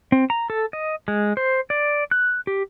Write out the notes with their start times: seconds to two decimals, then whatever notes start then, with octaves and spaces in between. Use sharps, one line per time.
0.12 C4
0.30 A#5
0.50 A4
0.73 D#5
1.08 G#3
1.37 C5
1.70 D5
2.11 F#6
2.47 G4